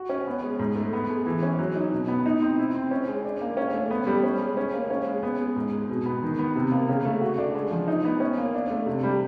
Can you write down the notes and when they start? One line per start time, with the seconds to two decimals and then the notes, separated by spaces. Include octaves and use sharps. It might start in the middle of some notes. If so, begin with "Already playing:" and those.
Already playing: F#4
0.09 C#4
0.27 B3
0.43 G#3
0.59 G#2
0.76 A3
0.93 B3
1.09 G#3
1.26 E3
1.43 C#4
1.59 F#3
1.76 D#4
1.92 B2
2.08 B3
2.26 D#4
2.42 C4
2.58 E4
2.74 C4
2.91 C#4
3.08 G#3
3.24 D4
3.41 A#3
3.57 C#4
3.74 A3
3.91 B3
4.07 G3
4.23 C#4
4.40 G#3
4.57 C#4
4.74 A#3
4.90 C#4
5.07 G#3
5.23 B3
5.40 G#3
5.56 G#2
5.73 G#3
5.89 B2
6.06 B3
6.22 D#3
6.39 B3
6.56 C3
6.72 A#3
6.88 C#3
7.05 A3
7.21 F#4
7.38 D4
7.55 G#3
7.71 F3
7.88 D#4
8.05 B3
8.20 C#4
8.38 A#3
8.54 D4
8.70 A3
8.86 C3
9.03 G3